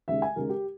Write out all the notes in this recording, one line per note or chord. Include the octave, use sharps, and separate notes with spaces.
D#2 C#3 G#3 E5
G#5
D#2 C#3 G#3 A#4
G4